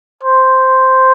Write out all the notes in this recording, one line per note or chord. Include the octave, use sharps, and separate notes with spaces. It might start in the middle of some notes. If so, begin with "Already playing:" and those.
C5